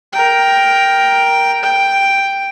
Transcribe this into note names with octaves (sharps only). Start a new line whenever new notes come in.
A#4 G5
G5